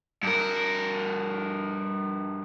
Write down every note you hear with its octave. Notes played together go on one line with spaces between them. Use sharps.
G2 A#4